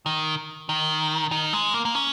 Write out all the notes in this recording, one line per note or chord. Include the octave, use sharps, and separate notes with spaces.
D#3
D#3
D#3
G#3
A#3
A#3
C#4